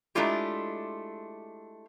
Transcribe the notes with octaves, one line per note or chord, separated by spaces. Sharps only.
G#3 A3 D4 E4 F4 G4